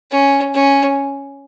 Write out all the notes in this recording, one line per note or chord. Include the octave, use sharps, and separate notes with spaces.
C#4
C#4